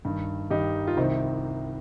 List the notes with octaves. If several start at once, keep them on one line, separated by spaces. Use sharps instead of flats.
G2 D#3
G2 D#3 D#4 G4
F4
C2 C3 D#3 C4 D#4